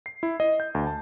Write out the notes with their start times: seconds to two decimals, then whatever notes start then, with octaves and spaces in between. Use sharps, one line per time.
0.06 C7
0.23 E4
0.40 D#5
0.60 G6
0.75 D2
0.87 A5